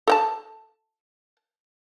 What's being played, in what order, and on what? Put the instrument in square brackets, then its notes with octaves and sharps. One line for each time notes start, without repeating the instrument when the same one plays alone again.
[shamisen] A4 G5 A5